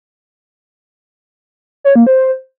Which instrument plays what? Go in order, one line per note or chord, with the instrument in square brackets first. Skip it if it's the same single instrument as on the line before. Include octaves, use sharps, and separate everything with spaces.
[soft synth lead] C#5
A#3
C5